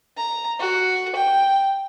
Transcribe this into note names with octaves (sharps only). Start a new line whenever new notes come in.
A#5
F#4
G5